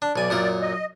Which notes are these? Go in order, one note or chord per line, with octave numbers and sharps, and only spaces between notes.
D4
B1 D5 G#5
F#2 A#2 A#4
D#5